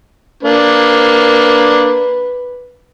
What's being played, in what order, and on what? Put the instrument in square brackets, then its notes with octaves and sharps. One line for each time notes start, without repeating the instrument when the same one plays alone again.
[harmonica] A#3 D4 [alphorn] B4